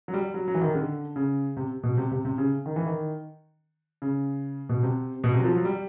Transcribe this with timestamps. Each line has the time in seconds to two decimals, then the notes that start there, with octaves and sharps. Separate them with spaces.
0.08 F#3
0.14 G3
0.34 F#3
0.48 F#3
0.54 E3
0.61 D#3
0.75 D3
1.16 C#3
1.57 C3
1.83 B2
1.97 C3
2.11 C3
2.25 C3
2.38 C#3
2.66 D#3
2.76 E3
2.86 D#3
4.02 C#3
4.69 B2
4.83 C3
5.24 B2
5.34 C3
5.39 F#3
5.44 F3
5.55 F#3
5.65 G3